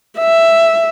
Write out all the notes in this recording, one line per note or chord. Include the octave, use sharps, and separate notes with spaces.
E5